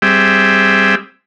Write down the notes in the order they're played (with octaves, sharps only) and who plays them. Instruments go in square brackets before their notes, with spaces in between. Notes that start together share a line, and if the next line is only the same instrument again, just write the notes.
[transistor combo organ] G3 C4 G#4 E5 G5